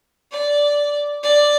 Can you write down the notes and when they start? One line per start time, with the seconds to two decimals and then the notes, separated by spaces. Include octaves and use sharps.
0.32 D5
1.23 D5